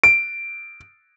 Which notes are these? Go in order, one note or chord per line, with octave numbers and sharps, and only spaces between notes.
D7